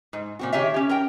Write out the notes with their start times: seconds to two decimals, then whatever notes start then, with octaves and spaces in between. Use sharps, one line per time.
0.13 G#2
0.39 A#2 C4 F#4
0.53 D#3 G4 G#4 C#5 E5
0.74 C#4 G4
0.89 A#4 G5